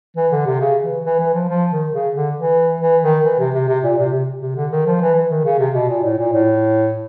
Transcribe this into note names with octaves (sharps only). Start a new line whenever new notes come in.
E3
D3
C3
C#3
E3
E3
E3
F3
F3
D#3
C#3
D3
E3
E3
D#3
E3
C3
C3
C3
A#2
C3
C3
C3
D3
D#3
F3
E3
E3
D#3
C#3
C3
B2
A#2
A2
A#2
A2